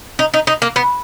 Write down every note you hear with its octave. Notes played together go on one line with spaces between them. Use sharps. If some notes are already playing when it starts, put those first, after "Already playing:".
D#4
D#4
D#4
A#3
B3